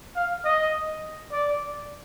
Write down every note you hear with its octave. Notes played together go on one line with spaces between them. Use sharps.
F5
D#5
D5